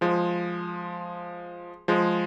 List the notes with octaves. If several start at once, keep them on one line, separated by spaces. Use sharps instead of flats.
F3 G#3
F3 G#3